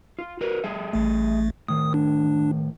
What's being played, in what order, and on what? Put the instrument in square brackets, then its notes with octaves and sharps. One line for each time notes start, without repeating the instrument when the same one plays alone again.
[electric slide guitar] F4
F#4 A#4 B4
G3 G#4 E5
[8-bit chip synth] A1 A3
[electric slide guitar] A2 D#3 [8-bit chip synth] D#6
[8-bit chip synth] D4